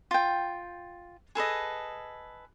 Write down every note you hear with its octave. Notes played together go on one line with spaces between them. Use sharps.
F4 G5
G#4 A4 B4 D#5